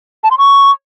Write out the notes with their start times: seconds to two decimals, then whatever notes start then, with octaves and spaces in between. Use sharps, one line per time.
0.24 A5
0.31 C6
0.38 C#6